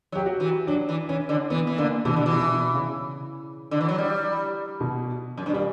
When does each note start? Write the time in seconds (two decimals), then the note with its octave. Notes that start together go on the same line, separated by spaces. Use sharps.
0.12 F#3 G4
0.26 F#4
0.40 E3
0.67 F#3 D4
0.89 E3
1.09 E3 C#4
1.29 D3
1.50 E3 B3
1.67 E3
1.78 D3 A#3
2.05 B2 E3
2.16 D3
2.26 E3
2.33 B2
2.74 C#3
3.71 D3
3.81 E3
3.88 F#3
3.98 G3
4.80 B2
5.37 F#2
5.46 G2
5.53 A#2 G3